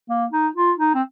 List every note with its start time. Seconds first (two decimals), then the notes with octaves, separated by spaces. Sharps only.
0.09 A#3
0.31 D#4
0.56 F4
0.78 D#4
0.95 C4